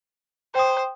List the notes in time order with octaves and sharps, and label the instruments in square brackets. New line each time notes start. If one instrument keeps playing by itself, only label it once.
[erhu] C5 [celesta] G5 D#6